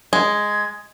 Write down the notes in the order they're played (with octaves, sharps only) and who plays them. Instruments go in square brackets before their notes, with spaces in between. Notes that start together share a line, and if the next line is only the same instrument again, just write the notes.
[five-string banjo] G#3 [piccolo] G#6